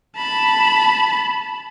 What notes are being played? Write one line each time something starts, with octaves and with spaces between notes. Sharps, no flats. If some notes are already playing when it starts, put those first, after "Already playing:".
A5 B5